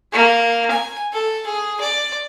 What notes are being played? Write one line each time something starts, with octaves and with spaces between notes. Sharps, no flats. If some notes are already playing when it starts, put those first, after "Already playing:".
A#3
G#5
A4
G#4
D5